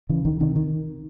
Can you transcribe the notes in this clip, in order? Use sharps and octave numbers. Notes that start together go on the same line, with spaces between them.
C#3 E3
C#2 D#3
C3 D#3
D#3